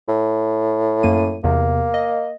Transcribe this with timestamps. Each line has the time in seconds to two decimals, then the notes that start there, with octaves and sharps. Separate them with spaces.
0.08 A2
1.03 F#2 A#3 D#7
1.44 E2 C3 A#3
1.94 D#5